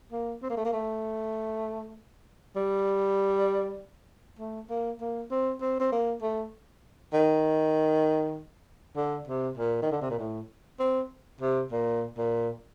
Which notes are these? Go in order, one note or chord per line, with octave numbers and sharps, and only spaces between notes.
A#3
C4
A#3
A3
A#3
A3
G3
A3
A#3
A#3
C4
C4
C4
A#3
A3
D#3
D3
C3
A#2
D#3
D3
C3
A#2
A2
C4
C3
A#2
A#2